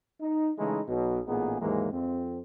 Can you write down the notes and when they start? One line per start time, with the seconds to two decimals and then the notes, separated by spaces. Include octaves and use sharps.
0.21 D#4
0.58 C#3 E3 G#3 A3 D#4 E4
0.89 B1 B2 F#3
1.27 A1 A#2 B3 D#4 G#4
1.61 D#2 G#2 E3 F#3 G#3 A#3
1.92 F2 C4